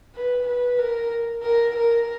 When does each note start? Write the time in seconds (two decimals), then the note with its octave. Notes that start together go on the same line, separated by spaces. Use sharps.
0.15 B4
0.47 B4
0.79 A#4
1.43 A#4
1.76 A#4